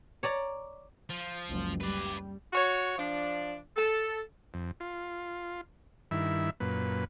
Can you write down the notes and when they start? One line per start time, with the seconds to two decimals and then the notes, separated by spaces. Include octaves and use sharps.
0.23 C#5 D5 A#5
1.10 F3
1.47 F#1 C#2
1.81 G3 B4 D5
2.53 F#4 C#5
2.98 F3 D4
3.76 A4
4.54 F2
4.80 F4
6.11 G2 D#3 E4 E5
6.60 F#2 A#2 B4